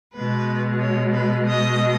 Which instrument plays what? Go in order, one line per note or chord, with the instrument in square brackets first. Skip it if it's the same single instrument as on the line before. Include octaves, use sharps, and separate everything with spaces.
[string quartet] B2 G#3 B4
C#5
B4
D#5